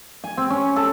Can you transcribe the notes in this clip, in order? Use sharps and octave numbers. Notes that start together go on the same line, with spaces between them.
G#5
C4
C#4
A4